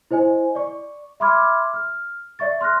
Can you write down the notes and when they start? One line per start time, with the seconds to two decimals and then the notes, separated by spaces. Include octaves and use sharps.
0.11 E4 C5 D#5 G#5
0.55 D5 C#6
1.20 E5 B5 C6 D6 F6 G#6
1.73 F6
2.39 D5 E5 C#6 A6
2.61 C6 F6 F#6 A#6